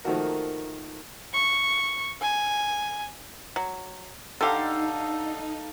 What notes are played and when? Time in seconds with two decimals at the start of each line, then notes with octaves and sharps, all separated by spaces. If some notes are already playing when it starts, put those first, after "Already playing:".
0.05 D#3 F3 A3 A#3 F#4 A#4
1.34 C#6
2.22 G#5
3.56 F#3
4.41 D3 D#4 G4 A4 F5 A#5